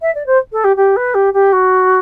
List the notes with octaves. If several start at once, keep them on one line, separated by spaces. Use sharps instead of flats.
E5
D5
C5
A4
G4
G4
B4
G4
G4
F#4